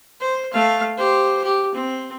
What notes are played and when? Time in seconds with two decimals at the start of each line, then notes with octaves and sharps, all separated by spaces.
0.20 C5
0.53 A3 F5
0.97 G4 C5
1.43 G4
1.75 C4